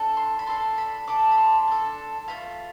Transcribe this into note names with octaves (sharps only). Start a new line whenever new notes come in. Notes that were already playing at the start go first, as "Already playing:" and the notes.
Already playing: D4 A4
C6
B5
D4 A4 C6
B5
D4 A4 D6
B5
C6
D4 A4
A3 C4 F4 B5